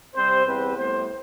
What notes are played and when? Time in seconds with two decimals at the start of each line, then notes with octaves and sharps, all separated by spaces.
0.15 C3 G3 C4 C5
0.45 E2 C3 G3 C4 B4
0.76 A2 G3 B3 C5